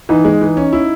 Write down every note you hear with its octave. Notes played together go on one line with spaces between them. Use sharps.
E3 D#4
G#3
E3
C#4
E4